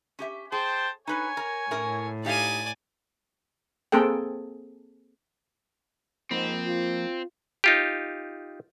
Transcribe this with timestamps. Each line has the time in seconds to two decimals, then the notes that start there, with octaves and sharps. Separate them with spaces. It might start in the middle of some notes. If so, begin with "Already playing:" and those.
0.19 C#4 G4 E5
0.52 G#4 C5 G5 A5
1.07 D#4 B4 C#5 G#5
1.37 A#4
1.71 A2 C#4 E4 A#4
2.25 D#4 G4 D5 F5 G#5
3.92 A#3 C4 G#4 A4 G5
6.31 G#2 F3 A#3 C4 B5
6.65 F4
7.64 D#4 F4 G4